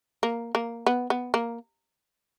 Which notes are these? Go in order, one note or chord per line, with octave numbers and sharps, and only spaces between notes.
A#3
A#3
B3
B3
A#3